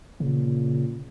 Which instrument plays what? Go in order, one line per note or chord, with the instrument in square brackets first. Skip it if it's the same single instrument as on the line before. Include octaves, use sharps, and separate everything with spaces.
[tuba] A#2 [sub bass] C#3